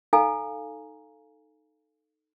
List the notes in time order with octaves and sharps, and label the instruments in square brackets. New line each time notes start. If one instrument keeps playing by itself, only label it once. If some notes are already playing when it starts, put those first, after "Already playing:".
[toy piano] D#4 A4 F5 G#5 A#5